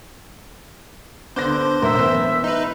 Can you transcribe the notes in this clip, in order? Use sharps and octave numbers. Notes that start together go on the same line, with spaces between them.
D3 B3 D4 C5 D6 F#6 A#6
E1 A1 F#2 A#4 E5
E3 B3
D#4 B4